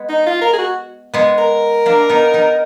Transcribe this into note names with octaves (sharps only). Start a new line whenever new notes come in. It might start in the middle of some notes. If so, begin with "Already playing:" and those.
Already playing: G#3 B3
D#4
F4
A#4
G#4
F#4
G#3 B3
A#4
A#3 D4
B3 D#4
B3 D#4